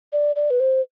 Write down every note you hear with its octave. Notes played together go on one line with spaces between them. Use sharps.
D5
D5
B4
C5